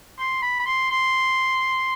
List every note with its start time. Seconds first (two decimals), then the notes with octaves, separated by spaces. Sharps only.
0.18 C6
0.42 B5
0.60 B5
0.66 C6
0.90 C6